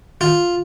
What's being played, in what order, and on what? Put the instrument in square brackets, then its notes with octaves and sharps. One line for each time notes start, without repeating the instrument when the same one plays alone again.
[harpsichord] F4